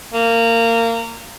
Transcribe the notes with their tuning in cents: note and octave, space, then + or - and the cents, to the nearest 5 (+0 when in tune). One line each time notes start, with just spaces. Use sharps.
A#3 -20